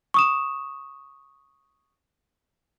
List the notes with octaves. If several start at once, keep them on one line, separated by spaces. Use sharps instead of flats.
C#6 D#6 E7